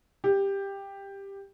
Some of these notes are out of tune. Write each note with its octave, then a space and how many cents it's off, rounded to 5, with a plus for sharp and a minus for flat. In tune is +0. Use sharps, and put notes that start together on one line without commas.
G4 +10